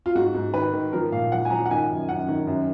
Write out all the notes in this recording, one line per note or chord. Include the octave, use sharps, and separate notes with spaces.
F4
G#2 F#4
G#2
D#3 B4
D#3
F3 A#4
A#2 F5
F3 F#5
G#5
F3 A#5
F#5
D#3 G#5
F#2
F#2 F#5
D#3
F#2